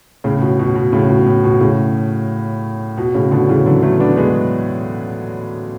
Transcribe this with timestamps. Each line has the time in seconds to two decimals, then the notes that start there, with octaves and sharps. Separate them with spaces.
0.24 A2 C#3
0.41 B2
0.59 B2
0.75 B2
0.93 A2 C#3
1.10 B2
1.26 A2
1.44 B2
1.60 A2 C#3
2.97 B2
3.14 A2 C#3
3.31 B2 D3
3.49 C#3 E3
3.66 D3 F#3
3.82 F#3 A3
4.00 B3 D4
4.16 G#3 B3